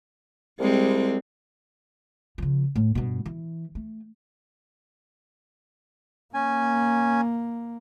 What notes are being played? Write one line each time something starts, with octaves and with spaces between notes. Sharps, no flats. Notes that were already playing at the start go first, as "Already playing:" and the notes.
C2 G3 G#3 C4
C#3 F3
A2
G2 B2
E3
A3
A#3 C#4 G#5